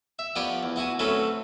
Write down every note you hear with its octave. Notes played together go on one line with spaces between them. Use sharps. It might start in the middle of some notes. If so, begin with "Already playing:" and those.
E5
F3 B3 G4 B4 C#5 D5
E2
B3 E4 F#4 G#5
F#3 A3 C4 C#4 A4 B4